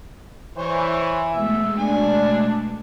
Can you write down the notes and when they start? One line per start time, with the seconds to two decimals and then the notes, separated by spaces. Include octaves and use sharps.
0.58 E3 C5 C#5
1.32 B2 G#3 A3 E5
1.79 D4 G#5